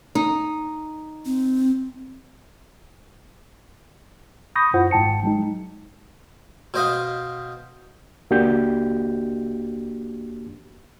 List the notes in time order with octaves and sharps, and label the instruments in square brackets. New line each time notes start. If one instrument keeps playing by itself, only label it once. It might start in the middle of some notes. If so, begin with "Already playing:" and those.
[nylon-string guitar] D#4
[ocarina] C4
[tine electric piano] B5 C#6 D#6 G6 A#6
F#2 E4 F4 C5 F#5
G#1 G#2 G5 A5 C#7
F#3 G#3 D#4
[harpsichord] B2 C5 D#5 F5
[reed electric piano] C#2 A#3 D4 F#4 G4 G6